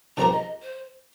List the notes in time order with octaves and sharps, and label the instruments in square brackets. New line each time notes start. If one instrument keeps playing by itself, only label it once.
[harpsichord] C#3 F3 C4 G4 A#4 [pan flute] A#5
[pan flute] D#5
C5